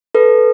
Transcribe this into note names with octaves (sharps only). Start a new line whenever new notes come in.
A4 B4